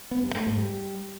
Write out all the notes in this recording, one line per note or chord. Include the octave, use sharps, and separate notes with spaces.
B3
G2
A3
G#2
G3